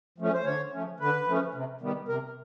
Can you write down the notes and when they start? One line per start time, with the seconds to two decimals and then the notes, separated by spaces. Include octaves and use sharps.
0.18 F3 A3 C#4
0.33 C5
0.44 D3 C#5
0.73 F3 A3 C#4
1.00 D3 B4
1.27 F3 A3 C#4
1.54 C3
1.81 D#3 G3 B3
2.08 C3 A#4